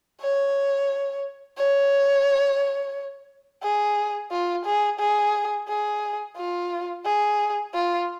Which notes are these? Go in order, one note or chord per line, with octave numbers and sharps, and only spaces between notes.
C#5
C#5
G#4
F4
G#4
G#4
G#4
F4
G#4
F4